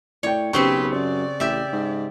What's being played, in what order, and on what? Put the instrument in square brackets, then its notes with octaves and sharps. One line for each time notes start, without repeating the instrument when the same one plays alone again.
[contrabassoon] A2 [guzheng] C#5 [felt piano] D5 G5
[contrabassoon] B1 [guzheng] C#3 C4 C6 [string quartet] G4 B4 [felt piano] C#6
[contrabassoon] F#2 [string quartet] D5
[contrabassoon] A1 [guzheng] G4 E5
[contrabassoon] G#2